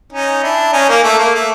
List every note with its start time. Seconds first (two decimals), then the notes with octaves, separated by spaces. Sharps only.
0.12 C#4 D#4
0.43 D4 E4
0.73 C#4 D#4
0.89 A#3
1.04 A3
1.19 A#3
1.34 A3